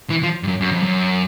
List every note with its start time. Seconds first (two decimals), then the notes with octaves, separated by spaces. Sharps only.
0.10 E3
0.23 F3
0.43 G2
0.48 F#2
0.61 F#2
0.72 F2
0.83 F#2